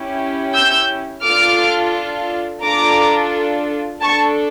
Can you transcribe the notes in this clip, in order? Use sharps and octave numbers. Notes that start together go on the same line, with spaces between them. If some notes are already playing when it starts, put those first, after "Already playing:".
Already playing: C#4 E4 G4
E6 G6
D4 F4 A4 D6 F6
D4 F4 A4 A#5 D6
D4 A4 A5 C#6